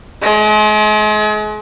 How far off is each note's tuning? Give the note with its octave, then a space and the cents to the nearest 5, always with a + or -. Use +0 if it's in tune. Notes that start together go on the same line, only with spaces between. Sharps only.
G#3 +40